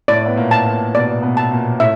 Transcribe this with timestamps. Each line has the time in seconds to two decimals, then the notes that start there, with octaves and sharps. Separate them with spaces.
0.08 A2 A3 D5
0.26 B3
0.36 A#2 A#3
0.51 A5
0.65 A#2 A#3
0.94 B2 B3 D5
1.22 B2 B3
1.37 A5
1.52 A#2 A#3
1.80 A2 A3 E5